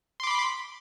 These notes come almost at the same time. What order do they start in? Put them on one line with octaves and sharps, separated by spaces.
C6 D6 B5